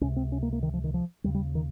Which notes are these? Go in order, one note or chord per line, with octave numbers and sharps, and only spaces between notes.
C#2 C3 C#4
C4
C#4
A#3
A#3
D#3
F3
D#3
F3
D#2 C#3 G3
G3
D#3